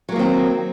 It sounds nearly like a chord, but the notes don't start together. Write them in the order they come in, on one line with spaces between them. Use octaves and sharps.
F#3 A#3 D#3 C4